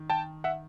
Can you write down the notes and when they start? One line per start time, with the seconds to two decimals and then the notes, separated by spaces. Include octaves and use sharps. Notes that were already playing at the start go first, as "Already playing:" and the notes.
Already playing: D#3
0.10 G5 A5
0.44 E5 F#5